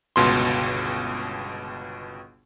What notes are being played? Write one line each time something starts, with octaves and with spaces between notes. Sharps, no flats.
G1 C#2 B2 C6